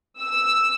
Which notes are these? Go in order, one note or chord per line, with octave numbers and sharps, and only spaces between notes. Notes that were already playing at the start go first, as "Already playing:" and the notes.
E6